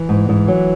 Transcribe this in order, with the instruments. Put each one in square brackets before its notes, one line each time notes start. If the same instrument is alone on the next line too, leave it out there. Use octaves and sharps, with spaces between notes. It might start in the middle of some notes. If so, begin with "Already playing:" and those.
Already playing: [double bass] E3
[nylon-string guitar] G#2
G#2
F#3